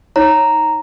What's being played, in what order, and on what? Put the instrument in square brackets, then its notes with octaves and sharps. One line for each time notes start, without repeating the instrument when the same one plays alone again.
[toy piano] D#4 C#5 [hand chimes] A#5